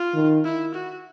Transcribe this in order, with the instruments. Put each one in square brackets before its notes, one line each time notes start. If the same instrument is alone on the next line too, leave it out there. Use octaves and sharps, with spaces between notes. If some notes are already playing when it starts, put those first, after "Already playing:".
Already playing: [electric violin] F4
[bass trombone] D#3
[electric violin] E4
F#4